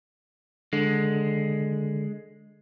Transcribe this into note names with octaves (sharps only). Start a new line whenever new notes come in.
D3 G#3